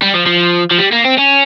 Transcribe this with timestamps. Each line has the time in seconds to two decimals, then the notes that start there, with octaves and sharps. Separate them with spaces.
0.02 G3
0.14 F3
0.27 F3
0.71 F3
0.78 G3
0.92 A#3
1.04 C4
1.18 C#4